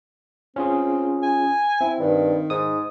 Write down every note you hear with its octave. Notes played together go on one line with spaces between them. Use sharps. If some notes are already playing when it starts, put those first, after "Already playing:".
C4 C#4 F4 G#4
G#5
C4 E4
G2 D#3
G#2 D#6